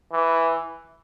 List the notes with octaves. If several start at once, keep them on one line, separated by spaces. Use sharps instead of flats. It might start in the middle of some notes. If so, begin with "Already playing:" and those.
E3